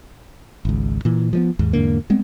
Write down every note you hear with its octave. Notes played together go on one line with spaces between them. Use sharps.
G#1 C#2
A#2 E3
F3 G#3 B3
D#2 G#2
E2 G#2 D3 A#3
G3 G#3 B3 C4